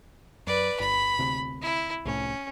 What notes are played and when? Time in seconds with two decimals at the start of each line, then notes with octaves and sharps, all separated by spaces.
0.47 F#2 B4 D5
0.80 G1 B5
1.19 D2 C3
1.62 E4
2.05 C2 A2 C#4